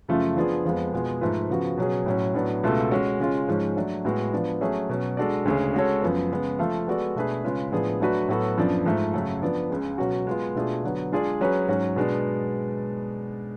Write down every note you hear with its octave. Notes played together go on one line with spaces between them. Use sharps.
F#2 C#3 F3 A3 F4
F3 B3 D4 F4 G#4
F2 F3 G#3 B3
B2 G#3 B3 F4 G#4
G#2 F3 A3 F4 B4
C#3 F3 B3 F#4
B2 F#3 C#4 G#4
A2 F#3 C#4
A2 F#3 B3 D4
C#2 B2 A3 F4 A4
G#3 C#4 F#4
C#3 G#3 C#4 F4
G#2 F3 G#3 C#4
F#3 A3 D4
A2 G#3 B3 F#4
F3 B3 D4
F#3 A3 C#4 G#4
B2 F#3 C#4
G#3 D4 F#4 A4 D5
D2 C#3 G#3 C#4 G#4
G#3 C#4 F#4 A4 C#5
F#2 F3 B3
C#3 G#3 B3
F3 A3 F4 A4 F5
G#3 B3 F#4 A4 D5
B2 A3 D4 G#4 B4
C#3 G#3 C#4 F4 B4
A2 F3 B3 D4 G#4
F#3 A3 D4 F#4 B4
A2 F#3 B3 F#4 A4
F#2 F3 B3 D4
G#2 F3 A3
F#2 C#3 F#3 A3
F3 B3 D4
C#2 C#3 G#3
B2 F#3 C#4 F#4
G#3 B3 F4
B2 A3 D4 F4 G#4
D3 F#3 B3
G#3 D4 F4 G#4 D5
F#3 C#4 G#4 B4
G#2 F#3 C#4 F#4
B2 G#3 B3 D4